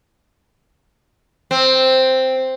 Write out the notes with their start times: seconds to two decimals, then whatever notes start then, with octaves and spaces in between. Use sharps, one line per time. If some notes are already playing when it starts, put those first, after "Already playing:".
1.51 C4